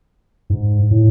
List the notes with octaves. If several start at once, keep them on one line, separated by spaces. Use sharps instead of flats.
G#2
A2